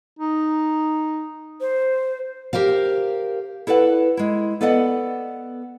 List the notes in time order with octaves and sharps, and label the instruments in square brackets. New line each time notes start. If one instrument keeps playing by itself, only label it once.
[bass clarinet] D#4
[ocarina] C5
[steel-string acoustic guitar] G4 A#4 C5 F5
[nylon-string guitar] E4 A4 B4 D5 F#5
G#3 E4
B3 A4 D5 D#5 F#5